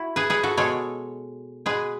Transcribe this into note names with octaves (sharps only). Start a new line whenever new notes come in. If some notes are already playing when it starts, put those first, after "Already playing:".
Already playing: E4 F#4
G#4 B4
G#4 B4
F#4 A4
B2 G#3 A4 C#5
B2 G#3 G#4 B4